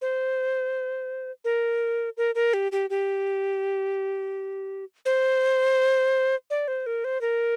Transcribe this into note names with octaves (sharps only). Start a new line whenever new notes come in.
C5
A#4
A#4
A#4
G4
G4
G4
C5
D5
C5
A#4
C5
A#4